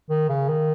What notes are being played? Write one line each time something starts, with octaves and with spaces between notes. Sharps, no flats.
D#3
C#3
D#3